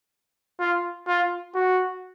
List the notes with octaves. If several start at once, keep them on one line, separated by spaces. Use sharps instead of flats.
F4
F4
F#4